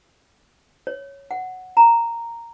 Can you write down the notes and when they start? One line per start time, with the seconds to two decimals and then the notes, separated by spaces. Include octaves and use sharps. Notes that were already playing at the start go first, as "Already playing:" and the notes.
0.87 C#5
1.31 F#5
1.77 A#5